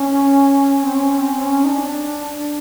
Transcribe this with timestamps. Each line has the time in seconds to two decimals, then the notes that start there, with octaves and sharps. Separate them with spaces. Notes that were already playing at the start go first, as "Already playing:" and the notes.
Already playing: C#4
0.83 C4
0.95 C#4
1.18 C4
1.41 C#4
1.64 D#4
1.68 D4